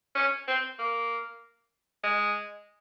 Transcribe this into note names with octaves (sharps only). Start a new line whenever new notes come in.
C#4
C4
A#3
G#3